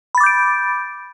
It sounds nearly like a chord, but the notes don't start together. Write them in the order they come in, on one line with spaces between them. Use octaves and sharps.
B5 A6 D6 G6 D7